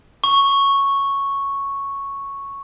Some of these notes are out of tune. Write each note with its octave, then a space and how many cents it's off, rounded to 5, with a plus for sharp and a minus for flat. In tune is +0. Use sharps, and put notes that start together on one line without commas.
C#6 -5